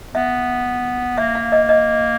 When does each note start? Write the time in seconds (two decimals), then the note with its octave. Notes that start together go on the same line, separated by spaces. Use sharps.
0.15 B3 E5
1.18 A#3 E5
1.35 F5
1.52 D#5
1.69 D#5